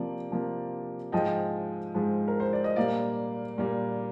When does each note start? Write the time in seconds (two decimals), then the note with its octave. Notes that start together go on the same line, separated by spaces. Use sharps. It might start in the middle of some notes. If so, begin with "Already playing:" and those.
Already playing: C3 F3 A#3 D5
0.31 C3 F3 A#3
1.12 G#2 F3 G#3 D#5 G5
1.95 G#2 F3 G#3
2.28 A#4
2.40 C5
2.53 D5
2.64 D#5
2.76 A#2 G3 A#3 D5 F5
3.58 A#2 G3 A#3